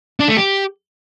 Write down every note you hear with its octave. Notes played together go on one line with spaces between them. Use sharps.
D4
A3
G4